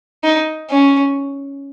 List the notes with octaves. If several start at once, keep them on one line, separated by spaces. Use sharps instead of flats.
D#4
C#4